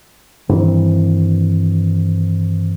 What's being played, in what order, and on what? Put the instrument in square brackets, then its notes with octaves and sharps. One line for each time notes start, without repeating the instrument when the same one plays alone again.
[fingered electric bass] G2 D#3 E3 C4